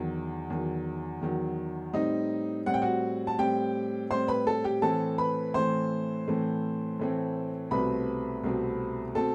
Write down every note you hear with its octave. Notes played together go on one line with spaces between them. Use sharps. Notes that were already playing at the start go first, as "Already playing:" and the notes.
Already playing: E2 D#3 F#3
E2 D#3 F#3
E2 D#3 F#3
A2 G3 C4 D#4 D#5
A2 G3 C4 F#5
G5
F#4 F#5
A5
A2 G3 C4 G4 G5
A2 G3 C4 C5 C6
B4 B5
A4 A5
G4 G5
A2 E3 A3 C4 A4 A5
B4 B5
A2 E3 A3 C4 C5 C6
A2 E3 A3 C4
A2 E3 A3 C4
C2 B2 A3 C4 B4 B5
C2 B2 A3 C4
B2 A3 C4 A4 A5